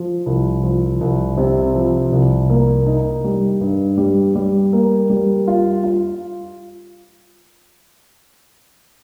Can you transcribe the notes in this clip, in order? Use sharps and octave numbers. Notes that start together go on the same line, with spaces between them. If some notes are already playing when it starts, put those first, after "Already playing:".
Already playing: F3
C2
F3
C2
C3
F3
C2
A#3
D#4
G3
G2
G3
G3
A#3
G3
F4
F4